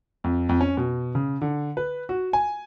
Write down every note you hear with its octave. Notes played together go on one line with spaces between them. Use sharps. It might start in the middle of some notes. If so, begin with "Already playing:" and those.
F2
F2
C#4
B2
C#3
D3
B4
F#4
G#5